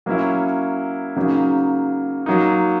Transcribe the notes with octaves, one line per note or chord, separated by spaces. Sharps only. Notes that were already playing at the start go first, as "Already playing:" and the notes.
F#3 A#3 C#4 E4
C#3 F#3 A#3 D#4
F#3 A#3 D#4